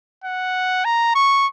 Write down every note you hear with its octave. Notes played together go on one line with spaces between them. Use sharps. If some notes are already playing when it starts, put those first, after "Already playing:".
F#5
A#5
C#6